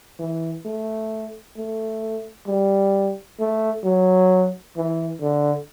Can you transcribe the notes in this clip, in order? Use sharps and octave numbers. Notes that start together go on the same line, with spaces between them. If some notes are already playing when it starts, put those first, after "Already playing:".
E3
A3
A3
G3
A3
F#3
E3
D3